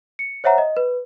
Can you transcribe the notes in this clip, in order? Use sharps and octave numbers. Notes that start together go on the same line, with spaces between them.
C#7
C5 C#5 E5 F#5 A#5
D#5
B4